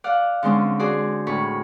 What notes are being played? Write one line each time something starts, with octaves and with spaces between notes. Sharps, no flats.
D5 F5 F#5
D3 G#3 C4 C#4
F#4 G#4 C5 D5
D2 A2 G#5 B5 C#6